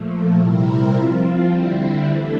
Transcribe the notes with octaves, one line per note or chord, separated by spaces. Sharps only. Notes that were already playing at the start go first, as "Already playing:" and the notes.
Already playing: A#2 F3 A3
C3 G3 C4 E4 A#4
F3 C4 F4
D3 G3 C4 E4
E3 A3 D4 A4